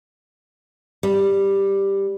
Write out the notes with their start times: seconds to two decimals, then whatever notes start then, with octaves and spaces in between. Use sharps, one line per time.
1.03 G3